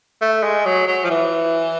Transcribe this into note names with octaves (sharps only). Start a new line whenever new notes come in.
A3
G#3
F#3
F#3
F3
E3